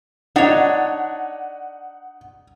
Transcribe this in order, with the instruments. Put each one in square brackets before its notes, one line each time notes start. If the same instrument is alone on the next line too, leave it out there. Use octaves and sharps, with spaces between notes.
[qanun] D4 C#5 [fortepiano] D#4 [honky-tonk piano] F#5